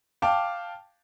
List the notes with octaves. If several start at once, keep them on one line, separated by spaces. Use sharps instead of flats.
F5 G5 A5 D6